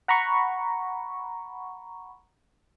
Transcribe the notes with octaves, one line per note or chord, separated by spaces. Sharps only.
F#5 A#5 B5 C#6